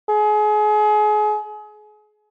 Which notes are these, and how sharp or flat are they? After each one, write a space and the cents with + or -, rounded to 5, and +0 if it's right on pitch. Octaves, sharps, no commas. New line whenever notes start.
G#4 +30